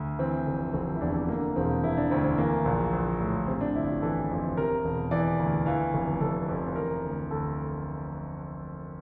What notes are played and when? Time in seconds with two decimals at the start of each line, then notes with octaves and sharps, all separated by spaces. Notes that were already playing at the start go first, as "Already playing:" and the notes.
Already playing: D2
0.19 E3 C4
0.47 F1
0.73 F1 C4
0.95 E4
1.01 E2 D4
1.28 D3 A#3
1.56 E1 C4
1.83 E1 E4
1.97 D4
2.11 D2 C4
2.24 C4
2.38 E3 A#3
2.65 A#1
2.93 A#1
3.20 A2
3.47 C3 C4
3.61 D4
3.75 G1 E4
3.88 G4
4.02 E3 A4
4.30 F2
4.57 C3 A#4
4.85 E1
5.11 E3 D5
5.39 D2
5.66 E3 F5
5.94 F1
6.21 F1 A4
6.49 F2
6.76 E3 A#4
7.03 D2
7.30 D2 A4